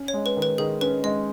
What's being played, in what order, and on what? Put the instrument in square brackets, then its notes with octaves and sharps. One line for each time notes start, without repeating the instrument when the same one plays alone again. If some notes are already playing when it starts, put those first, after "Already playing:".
Already playing: [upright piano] C#4
[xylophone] C#5
[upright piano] G#3
[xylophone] B4
[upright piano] D#3
[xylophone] B4
[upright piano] D#3 [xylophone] G#4
[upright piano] C#4 [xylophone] B4
[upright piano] G#3 [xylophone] D#5